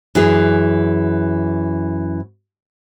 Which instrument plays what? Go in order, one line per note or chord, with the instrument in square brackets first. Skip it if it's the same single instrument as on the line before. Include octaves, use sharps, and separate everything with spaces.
[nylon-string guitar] F#2 E3 G#4